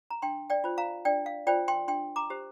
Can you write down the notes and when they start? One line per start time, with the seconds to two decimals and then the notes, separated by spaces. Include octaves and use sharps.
0.10 A#5
0.22 D4 G5 C6
0.50 D5 G5
0.64 F4 C5
0.78 F5 A#5
1.05 D4 D5 G5
1.26 F5
1.47 F4 C5 D5 G5
1.68 G5 C6
1.88 D4 G5 C6
2.16 A#5 D6
2.30 G4 C5